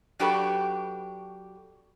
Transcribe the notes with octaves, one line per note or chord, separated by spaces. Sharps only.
F#3 D4 F#4 G4 A4 B4